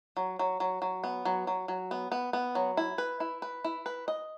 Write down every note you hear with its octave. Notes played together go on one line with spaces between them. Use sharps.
F#3
F#3
F#3
F#3
B3
F#3
F#3
F#3
B3
B3
B3
F#3
E4
B4
E4
B4
E4
B4
D#5